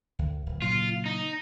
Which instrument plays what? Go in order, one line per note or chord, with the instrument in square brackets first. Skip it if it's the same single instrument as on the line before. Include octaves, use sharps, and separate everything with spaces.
[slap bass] D2
D1
[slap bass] A#2 C#3 F#3 [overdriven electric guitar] F4
[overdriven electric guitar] D#4